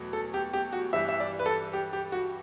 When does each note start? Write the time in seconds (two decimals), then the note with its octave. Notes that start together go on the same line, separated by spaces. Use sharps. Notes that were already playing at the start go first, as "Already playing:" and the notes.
Already playing: E2 B2 F#3 A3
0.13 A4
0.34 G4
0.53 G4
0.73 F#4
0.93 G2 E3 G3 E5
1.08 E5
1.20 D5
1.39 B4
1.46 A4
1.73 G4
1.93 G4
2.12 F#4